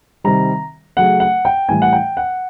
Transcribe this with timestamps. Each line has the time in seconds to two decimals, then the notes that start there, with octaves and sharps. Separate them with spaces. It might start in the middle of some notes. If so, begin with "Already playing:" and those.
0.24 C3 D#3 G3 A#5
0.97 C#3 F#3 A3 F#5
1.20 F#5
1.45 G5
1.68 A2 E3 G3 G#5
1.82 F#5
1.93 G5
2.17 F#5